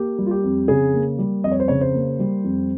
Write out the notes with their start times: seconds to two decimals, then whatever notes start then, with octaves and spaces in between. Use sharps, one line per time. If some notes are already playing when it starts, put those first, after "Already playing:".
Already playing: A#3 G4
0.18 G3
0.26 F4
0.31 G4
0.44 F2
0.68 C#3 G#4
0.94 A#3
1.19 G3
1.44 F2 D#5
1.52 C#5
1.60 C5
1.68 C#3 C#5
1.81 C5
1.95 A#3
2.19 G3
2.44 F2